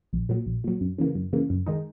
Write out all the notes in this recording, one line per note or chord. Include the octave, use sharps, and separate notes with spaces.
A#1
A#2 F#3
A#1
A#2 F#3
F#2
C#3 E3 A#3
F#2
C#3 E3 A#3
F#2
D#3 G#3 D#4